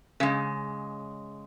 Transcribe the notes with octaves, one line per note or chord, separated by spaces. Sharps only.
C#3 G#3